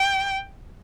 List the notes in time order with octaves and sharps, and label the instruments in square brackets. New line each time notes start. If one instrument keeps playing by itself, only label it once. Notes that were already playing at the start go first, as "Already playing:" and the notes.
Already playing: [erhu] G5